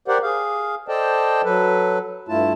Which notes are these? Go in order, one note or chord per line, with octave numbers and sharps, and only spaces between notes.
G4 A#4 C5 D5 F#5
G#4 F5
A4 C5 D5 D#5 G5 A5
F#3 A4 B4
G2 A3 E4 F4 A5